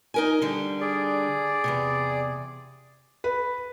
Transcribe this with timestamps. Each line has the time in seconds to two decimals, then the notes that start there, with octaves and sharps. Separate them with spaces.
0.14 D#4 A#4 G#5
0.42 D3 G3
0.81 G#4 D5
1.64 E2 G2 C3
3.24 B4